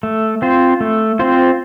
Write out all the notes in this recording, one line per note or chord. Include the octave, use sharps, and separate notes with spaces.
A3
C4 F4 C5
A3
C4 F4 C5